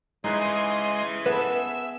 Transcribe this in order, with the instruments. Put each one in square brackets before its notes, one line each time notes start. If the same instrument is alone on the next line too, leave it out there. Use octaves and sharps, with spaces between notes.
[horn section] C#3 E3 [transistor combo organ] G#3 D#5 C6 [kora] D#4 B4
[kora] B3 G#4 A4 [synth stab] B4 [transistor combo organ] E5